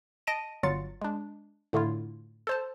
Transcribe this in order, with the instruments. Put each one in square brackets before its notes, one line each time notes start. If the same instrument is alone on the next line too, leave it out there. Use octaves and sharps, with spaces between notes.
[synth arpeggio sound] D#5 A5 A#6 D7 D#7
G1 F#3 F4 A6 C#7
G#3 D4
A2 D3 A3 E4 F4
A4 C5 A5